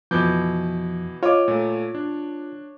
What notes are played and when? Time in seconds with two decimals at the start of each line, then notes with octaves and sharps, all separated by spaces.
0.11 F2 B2 E3 F3 D6 G6
1.23 F4 C#5 D#5 D6
1.48 A#2 A3
1.95 D4